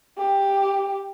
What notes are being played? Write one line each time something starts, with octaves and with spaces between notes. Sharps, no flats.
G4